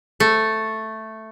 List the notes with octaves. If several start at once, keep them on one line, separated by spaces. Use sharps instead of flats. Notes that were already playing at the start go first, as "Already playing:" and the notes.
A3